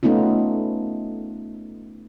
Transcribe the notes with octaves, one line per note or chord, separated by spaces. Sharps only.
A3 B3 C#4 D#4 F4